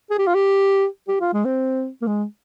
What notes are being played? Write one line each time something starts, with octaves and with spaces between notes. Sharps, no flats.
G#4
G4
F4
G4
G4
F4
G#3
C4
A#3
G#3